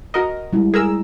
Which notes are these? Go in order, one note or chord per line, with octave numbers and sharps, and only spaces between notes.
F#4 A#4 D#5
G3 G#3 E4
G#4 A#4 E6